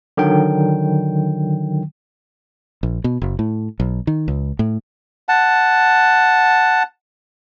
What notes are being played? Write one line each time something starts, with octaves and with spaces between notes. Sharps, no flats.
D3 D#3 F#3 G5
A#1
B2
F#1
A2
B1
D#3
C#2
A2
F#5 A5